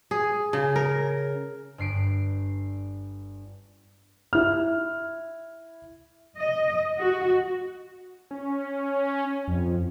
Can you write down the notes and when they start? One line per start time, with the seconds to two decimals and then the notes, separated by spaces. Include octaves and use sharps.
0.11 G#4
0.53 C#3
0.76 A#4
1.78 G1 G2 C7 D7
4.33 E4 F6
6.37 D#5
6.99 F#4
8.31 C#4
9.48 F2